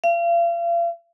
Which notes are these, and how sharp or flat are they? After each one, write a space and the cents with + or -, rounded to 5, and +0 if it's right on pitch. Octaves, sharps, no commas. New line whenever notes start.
F5 -40